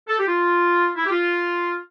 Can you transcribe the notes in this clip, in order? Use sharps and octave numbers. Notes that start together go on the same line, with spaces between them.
A4
G4
F4
E4
G4
F4